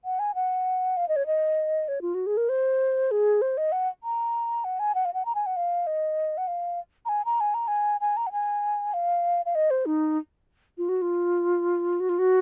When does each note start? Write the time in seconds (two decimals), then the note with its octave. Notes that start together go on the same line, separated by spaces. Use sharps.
0.05 F#5
0.19 G#5
0.35 F#5
0.97 F5
1.08 D#5
1.16 C#5
1.26 D#5
1.88 C#5
2.01 F4
2.14 F#4
2.26 G#4
2.37 A#4
2.49 C5
3.11 G#4
3.41 C5
3.57 D#5
3.72 F#5
4.03 A#5
4.64 F#5
4.79 G#5
4.95 F#5
5.05 F5
5.14 F#5
5.25 A#5
5.35 G#5
5.46 F#5
5.56 F5
5.87 D#5
6.37 F#5
6.47 F5
7.05 A#5
7.09 G#5
7.25 A#5
7.40 G#5
7.54 A#5
7.67 G#5
8.01 G#5
8.17 A#5
8.27 F#5
8.32 G#5
8.93 F5
9.46 F5
9.55 D#5
9.70 C5
9.86 D#4
10.78 F4
10.89 F#4
11.02 F4
12.00 F#4
12.09 F4
12.19 F#4